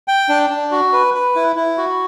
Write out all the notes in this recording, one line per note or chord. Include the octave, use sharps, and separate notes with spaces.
G5
D4
D4
F#4
B4
B4
E4
E4
F#4